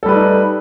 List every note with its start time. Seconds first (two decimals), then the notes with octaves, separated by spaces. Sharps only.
0.03 A4
0.06 G3
0.09 B4
0.12 A3
0.15 D#4